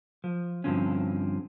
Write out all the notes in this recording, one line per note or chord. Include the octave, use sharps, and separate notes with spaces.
F3
G2 A#2 D3 F3 C4 C#4